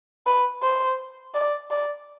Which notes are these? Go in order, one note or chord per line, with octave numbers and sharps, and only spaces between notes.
B4
C5
D5
D5